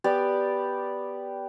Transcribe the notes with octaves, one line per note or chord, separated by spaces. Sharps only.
B3 G4 D5